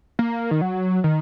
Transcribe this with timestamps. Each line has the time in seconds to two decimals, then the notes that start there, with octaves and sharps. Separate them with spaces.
0.19 A#3
0.51 D#3
0.61 F#3
1.04 D#3